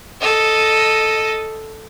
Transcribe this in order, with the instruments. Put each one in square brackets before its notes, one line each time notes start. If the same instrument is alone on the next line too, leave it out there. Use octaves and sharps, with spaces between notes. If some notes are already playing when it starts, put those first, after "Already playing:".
[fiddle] A4 D#5